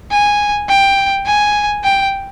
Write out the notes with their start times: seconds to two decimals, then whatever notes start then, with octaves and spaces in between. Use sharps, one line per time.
0.11 G#5
0.69 G5
1.26 G#5
1.84 G5